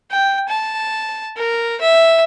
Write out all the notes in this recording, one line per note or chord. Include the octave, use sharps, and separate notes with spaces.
G5
A5
A#4
E5